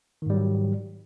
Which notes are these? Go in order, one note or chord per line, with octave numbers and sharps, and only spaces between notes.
G#2 D#3 F#3 G3